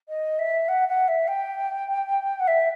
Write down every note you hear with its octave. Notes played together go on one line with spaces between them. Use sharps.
D#5
E5
F#5
F#5
E5
G5
F#5
E5